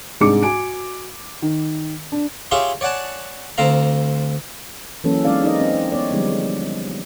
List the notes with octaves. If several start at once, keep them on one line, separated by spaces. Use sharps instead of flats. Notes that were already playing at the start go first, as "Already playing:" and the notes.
C2 G#2 G#3 D4 D6 C#7
F#4 G#5 D7
D#3
D4
F4 G4 G#4 C#5 E5
C#5 D5 F#5 G#5 A5
D2 C4 A4 F5 A#5
E3 F#3 A#3 C#4 A4
G#3 C4 C#4 D#4 D5 F5
D#4 A#4 D5 D#5
C4
B3 C#5 D5
D3 F3 G3 G#3 B3 D#4